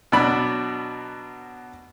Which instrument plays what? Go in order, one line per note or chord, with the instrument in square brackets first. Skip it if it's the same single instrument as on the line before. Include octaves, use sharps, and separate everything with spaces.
[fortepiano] B2 F#3 D4 B5 E6 F#6